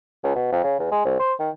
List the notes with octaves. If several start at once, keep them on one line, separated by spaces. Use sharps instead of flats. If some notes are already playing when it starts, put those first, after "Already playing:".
C#2
B2
F2
C#3
E2
G#3
C2
C5
D#3